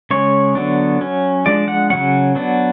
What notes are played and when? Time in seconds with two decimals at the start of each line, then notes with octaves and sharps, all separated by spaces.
0.11 C#3 G#3 C#4 C#5
0.55 D3 F#3 B3 D4
1.01 F#3 C#4
1.46 F3 G#3 D4 D5
1.68 F#5
1.90 C#3 F#3 C#4 F#5
2.35 F#3 B3 D4